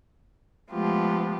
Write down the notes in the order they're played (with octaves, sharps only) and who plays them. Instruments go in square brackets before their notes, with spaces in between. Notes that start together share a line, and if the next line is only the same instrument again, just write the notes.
[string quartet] F3 G#3 A3 B3 F4 G4